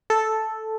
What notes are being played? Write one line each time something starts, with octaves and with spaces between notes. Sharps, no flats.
A4